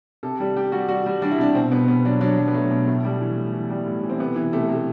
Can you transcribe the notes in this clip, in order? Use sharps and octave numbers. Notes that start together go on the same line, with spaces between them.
C3 A4
G3 G4
G3 G4
G3 F#4
G3 F#4
G3
G3 D4
E4
C3 D4
B2 C4
B2 B3
B2 B3
F#3 D4
F#3 D4
F#3
B3
F#3 A3
B2
A2 A3
G3
E3
A2
E3
G3
A2
E3
C4
C3 B3
E3
C3 A3
C3
A3